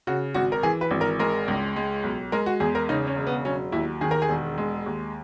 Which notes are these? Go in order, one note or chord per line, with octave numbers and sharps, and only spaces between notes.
C#3 F#4
G#1 F#4
A#4
E3 G#4
B4
G#1
A#4
G#3 A#4
C#2
G#3
B1
G#3 A#4
F#4
E2 G#4
A#4
C#3 D#4
C#4
E1
B3
F#3 C#4
D#2 E4
D#3 G#4
A#4
G#4
E1
G#3
D#2